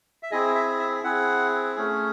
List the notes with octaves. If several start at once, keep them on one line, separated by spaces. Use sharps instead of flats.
E5
C4 E4 G#4 D#5
E5
E5
C4 E4 G#4 F#5
A3 C#4 G#4